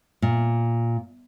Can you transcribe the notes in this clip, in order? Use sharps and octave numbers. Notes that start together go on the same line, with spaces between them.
A#2